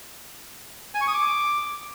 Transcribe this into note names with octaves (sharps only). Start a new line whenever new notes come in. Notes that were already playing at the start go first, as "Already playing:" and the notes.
G#5
C#6
D#6
D6